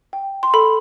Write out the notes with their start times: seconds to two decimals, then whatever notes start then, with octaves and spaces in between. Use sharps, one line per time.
0.13 G5
0.43 C6
0.54 A4 B5